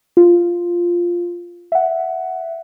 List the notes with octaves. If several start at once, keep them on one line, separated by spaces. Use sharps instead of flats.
F4
E5 F#5